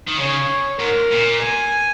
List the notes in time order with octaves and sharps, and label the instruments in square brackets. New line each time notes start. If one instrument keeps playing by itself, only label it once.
[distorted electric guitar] D#3
[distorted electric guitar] C#3 [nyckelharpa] C#5
[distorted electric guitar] G#2 [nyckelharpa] A#4
[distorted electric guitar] A#2
[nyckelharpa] G#5